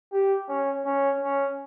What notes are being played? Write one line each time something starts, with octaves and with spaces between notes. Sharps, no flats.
G4
C#4
C#4
C#4